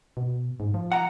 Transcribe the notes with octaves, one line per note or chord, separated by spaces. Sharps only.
B2
G#2
F3
F#5 A#5